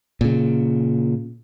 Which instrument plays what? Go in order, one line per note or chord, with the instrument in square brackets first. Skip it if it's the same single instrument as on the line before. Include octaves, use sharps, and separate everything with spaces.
[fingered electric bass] A#2 C#3